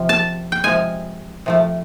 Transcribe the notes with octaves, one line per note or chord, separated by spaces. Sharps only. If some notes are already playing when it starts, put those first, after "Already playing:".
Already playing: C3 F3
A5
G5
C3 F3 G#3 G#5
C3 F3 A3